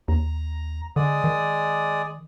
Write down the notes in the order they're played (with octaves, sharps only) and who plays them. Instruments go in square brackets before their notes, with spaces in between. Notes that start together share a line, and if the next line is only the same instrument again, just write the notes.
[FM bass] D#2 [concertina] A#5
[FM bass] D3 [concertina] G#3 D5 D#6
[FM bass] D#3